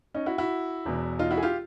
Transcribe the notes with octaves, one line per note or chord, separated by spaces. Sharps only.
C#4 D#4
E4 F#4
E4 F#4
E1 E2 B2
D#4 F4
E4 F#4
G#4
F4 G4